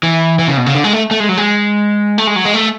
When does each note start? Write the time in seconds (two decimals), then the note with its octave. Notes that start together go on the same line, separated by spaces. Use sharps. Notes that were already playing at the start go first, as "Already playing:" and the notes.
0.03 E3
0.39 E3
0.48 C#3
0.57 B2
0.66 C#3
0.75 D3
0.84 G#3
0.93 A3
1.11 A3
1.20 G#3
1.29 F#3
1.37 G#3
2.18 A3
2.27 G#3
2.36 F#3
2.45 G#3
2.54 A3